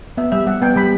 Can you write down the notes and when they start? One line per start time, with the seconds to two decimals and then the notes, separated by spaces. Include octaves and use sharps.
0.17 B3 E5
0.32 G3 E5
0.47 G3 F#5
0.62 B3 G5
0.76 G3 B5